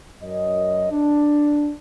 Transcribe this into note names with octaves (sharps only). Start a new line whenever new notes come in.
F#2 D#5
D4